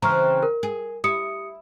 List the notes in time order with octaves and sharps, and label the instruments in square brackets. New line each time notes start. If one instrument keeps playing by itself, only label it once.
[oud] C#3 E3 C4 [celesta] A#5 C#6 F6
[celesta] A#4
[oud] G#4
[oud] E4 [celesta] G4 D#6 C#7